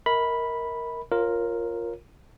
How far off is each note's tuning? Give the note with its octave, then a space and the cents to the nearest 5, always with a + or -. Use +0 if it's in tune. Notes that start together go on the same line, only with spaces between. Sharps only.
A#4 +0 D#5 +45 B5 -5
F4 +0 A#4 +0 C#5 -20